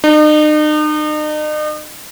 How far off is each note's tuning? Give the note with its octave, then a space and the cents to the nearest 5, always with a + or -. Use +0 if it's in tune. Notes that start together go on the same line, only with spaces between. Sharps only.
D#4 -40